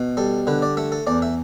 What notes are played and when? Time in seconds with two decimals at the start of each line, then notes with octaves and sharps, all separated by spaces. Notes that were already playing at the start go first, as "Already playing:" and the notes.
Already playing: B2
0.17 G3 A4
0.47 D3 B4
0.62 D5
0.77 A3 E5
0.92 A4
1.07 E2 D5
1.22 E5